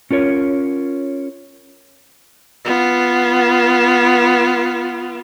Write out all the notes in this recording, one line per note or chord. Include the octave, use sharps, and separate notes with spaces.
C#4 F4 A#4 C#5
B3 F4